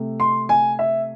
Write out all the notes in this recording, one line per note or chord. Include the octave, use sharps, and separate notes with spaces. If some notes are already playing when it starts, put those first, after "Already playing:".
Already playing: C3 A3
C6
G#5
E5